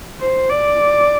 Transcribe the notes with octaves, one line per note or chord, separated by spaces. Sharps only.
C5
D5